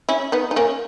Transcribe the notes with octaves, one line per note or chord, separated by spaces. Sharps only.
C#4 E4
B3 D#4
D#4
A#3 C#4